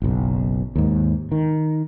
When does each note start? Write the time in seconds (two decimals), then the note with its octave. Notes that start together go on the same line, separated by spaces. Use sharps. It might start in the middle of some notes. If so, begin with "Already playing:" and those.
0.02 F#1 B1
0.76 D#2 G#2
1.32 D#3